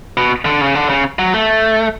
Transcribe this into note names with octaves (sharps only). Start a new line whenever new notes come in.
B2
D3
C#3
D3
C#3
F#3
A3